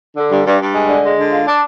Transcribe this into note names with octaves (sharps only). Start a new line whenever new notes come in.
D3
G2
G2
G2
G#3
D3
G#3
D3
F4
D4